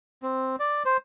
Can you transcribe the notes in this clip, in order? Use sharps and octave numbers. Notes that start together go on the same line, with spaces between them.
C4
D5
C5